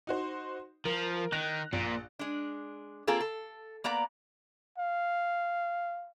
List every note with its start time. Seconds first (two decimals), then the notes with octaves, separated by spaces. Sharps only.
0.07 D#4 F#4 C5
0.85 F3 A#4
1.32 D#3 F#6 A#6 F7
1.73 A#1 A#2
2.19 G#3 D4
3.07 A#3 C4 F4 G#4 A4
3.21 A4
3.84 A#3 B3 D5 A#5
4.78 F5